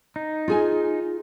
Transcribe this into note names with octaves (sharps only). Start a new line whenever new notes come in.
D#4
F4 G#4 G#5